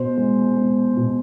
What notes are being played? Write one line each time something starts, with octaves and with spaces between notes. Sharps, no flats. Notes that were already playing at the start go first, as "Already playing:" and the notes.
Already playing: B2 C5
G#3
G#3
B2